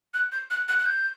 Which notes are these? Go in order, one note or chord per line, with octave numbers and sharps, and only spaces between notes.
F#6
G6
F#6
F#6
F#6
G6